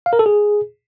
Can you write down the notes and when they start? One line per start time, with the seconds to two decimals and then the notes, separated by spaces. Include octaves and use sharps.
0.06 F5
0.13 A#4
0.19 A4
0.26 G#4